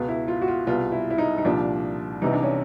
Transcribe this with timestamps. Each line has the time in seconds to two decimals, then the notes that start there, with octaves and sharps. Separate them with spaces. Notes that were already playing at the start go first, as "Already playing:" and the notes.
Already playing: C#2 B2
0.08 E4
0.28 F4
0.42 F#4
0.48 F4
0.67 C2 B2 F4
0.92 E4
1.10 E4
1.18 D#4
1.38 D#4
1.45 C2 A#2 F3 D4
2.22 C2 C3 E3 D#4
2.33 D4
2.43 C#4